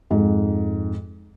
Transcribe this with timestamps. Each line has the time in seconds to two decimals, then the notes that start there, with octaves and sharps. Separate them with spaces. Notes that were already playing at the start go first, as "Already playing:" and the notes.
0.10 F2 G#2